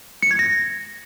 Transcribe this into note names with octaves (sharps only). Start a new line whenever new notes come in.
C#7
G#6
A#6